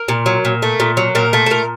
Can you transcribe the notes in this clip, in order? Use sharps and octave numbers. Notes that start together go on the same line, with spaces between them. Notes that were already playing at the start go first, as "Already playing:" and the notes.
Already playing: A#4
A#2
F#3
A#2
A3
A#2
F#3
A#2 A#4
A3 A4
A4
A#2 A#4